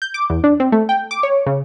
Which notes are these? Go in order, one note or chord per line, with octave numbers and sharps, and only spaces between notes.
G6
D6
E2
D4
C4
A3
G5
D6
C#5
C#3